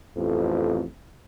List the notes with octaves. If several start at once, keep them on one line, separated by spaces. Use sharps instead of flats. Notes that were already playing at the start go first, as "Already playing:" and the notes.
A1 F2